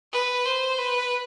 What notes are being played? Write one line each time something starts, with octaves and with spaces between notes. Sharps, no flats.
B4
C5
B4